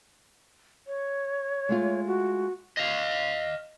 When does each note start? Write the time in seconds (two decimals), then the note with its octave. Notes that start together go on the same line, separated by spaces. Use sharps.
0.87 C#5
1.69 G#3 A3 F4
2.06 F#4
2.77 D#5 F5